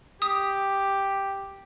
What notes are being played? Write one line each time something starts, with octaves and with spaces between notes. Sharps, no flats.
G4 D#6